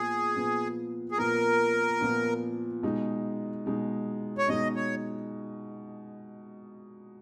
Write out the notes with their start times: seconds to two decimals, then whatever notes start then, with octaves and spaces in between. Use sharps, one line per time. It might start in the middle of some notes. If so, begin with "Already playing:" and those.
Already playing: A#2 F3 B3 G#4
0.35 A#2 F3 B3
1.12 G#4
1.18 A#2 F3 B3 A#4
2.01 A#2 F3 B3
2.83 B2 G#3 D#4
3.66 B2 G#3 D#4
4.38 C#5
4.48 B2 G#3 D#4 D#5
4.76 C#5